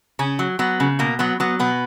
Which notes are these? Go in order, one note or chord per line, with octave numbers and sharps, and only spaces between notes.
C#3 C#4
F#3
F#3 B3
C#3
B2 A#3
F#3 B3
F#3 B3
B2 B3